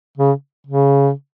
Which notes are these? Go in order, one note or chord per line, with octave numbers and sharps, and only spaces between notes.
C#3
C#3